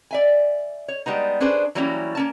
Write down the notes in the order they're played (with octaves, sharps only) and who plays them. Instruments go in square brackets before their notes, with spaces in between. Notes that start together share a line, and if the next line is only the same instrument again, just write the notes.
[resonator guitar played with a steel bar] D5 E5 G#5
C#5
G3 G#3 B3 D#4
C#4 D4 G#4 B4 C5
E3 F#3 G3 A#3 C#4 E4
A#3 C#4 A5